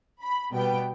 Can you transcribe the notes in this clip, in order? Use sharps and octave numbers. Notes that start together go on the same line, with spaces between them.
B5
B2 G3 B3 G5